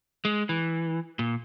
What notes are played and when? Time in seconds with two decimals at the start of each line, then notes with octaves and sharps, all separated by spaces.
0.25 G#3
0.49 E3
1.19 A#2